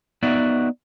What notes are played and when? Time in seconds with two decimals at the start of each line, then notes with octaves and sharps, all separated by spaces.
0.23 B3 D#4 F#4 D5 E5